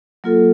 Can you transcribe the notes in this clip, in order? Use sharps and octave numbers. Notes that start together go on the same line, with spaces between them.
F#3 A#3 F4 A4